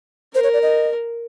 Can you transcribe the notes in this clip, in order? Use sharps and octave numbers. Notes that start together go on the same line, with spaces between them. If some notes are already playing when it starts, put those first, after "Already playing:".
A#4 C5
C#5
D5
D#5